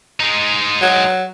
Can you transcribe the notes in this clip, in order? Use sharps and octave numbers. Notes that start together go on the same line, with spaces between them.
G#3 D#4
F#3